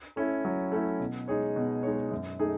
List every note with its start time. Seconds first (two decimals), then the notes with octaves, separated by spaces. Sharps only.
0.16 A3 C#4 E4
0.45 F#3
0.72 A3 C#4 E4
1.00 B2
1.28 G#3 D#4 G#4 C#5
1.56 B2
1.83 G#3 D#4 G#4 C#5
2.11 F#2
2.39 D#3 A3 D#4 G#4